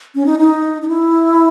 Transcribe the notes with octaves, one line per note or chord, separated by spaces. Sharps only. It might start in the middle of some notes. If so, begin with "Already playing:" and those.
C#4
D#4
D#4
D#4
E4